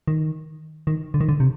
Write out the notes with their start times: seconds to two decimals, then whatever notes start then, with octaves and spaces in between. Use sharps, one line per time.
0.08 D#3
0.87 D#3
1.14 D3
1.21 D#3
1.29 D3
1.40 C3